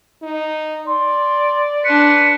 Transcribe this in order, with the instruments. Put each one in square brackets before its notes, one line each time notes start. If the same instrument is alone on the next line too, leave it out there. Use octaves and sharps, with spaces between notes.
[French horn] D#4
[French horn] D5 [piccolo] C6
[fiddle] D4 C6 [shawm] B4 [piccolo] C#7